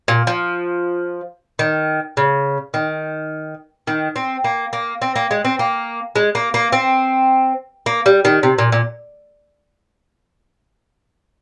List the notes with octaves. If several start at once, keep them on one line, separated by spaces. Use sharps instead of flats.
A#2
F3
D#3
C#3
D#3
D#3
C4
A#3
A#3
C4
A#3
G#3
C4
A#3
G#3
A#3
A#3
C4
A#3
G3
D#3
C3
A#2
A#2